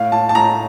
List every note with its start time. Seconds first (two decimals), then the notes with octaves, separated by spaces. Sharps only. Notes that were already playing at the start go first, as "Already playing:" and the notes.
Already playing: A2 F5
0.12 A2 A5
0.29 A5
0.35 A2 A#5